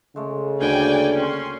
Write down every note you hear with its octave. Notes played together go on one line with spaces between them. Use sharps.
C#3 G#3 A3
D2 D3 G3 A#3 D5 G5 G#5
C#4 C6